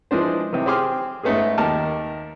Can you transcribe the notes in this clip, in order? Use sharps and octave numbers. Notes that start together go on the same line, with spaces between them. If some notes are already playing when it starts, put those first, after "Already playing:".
E3 F3 G#3 D4 C5
C3 D#3 E3
C4 G4 G#4 C6 D6 F6
G#2 A3 B3 C#4 G#4
D#2 A#3 G4 A#4 A5